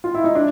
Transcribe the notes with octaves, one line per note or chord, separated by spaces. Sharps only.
F4
E4
D#4
D4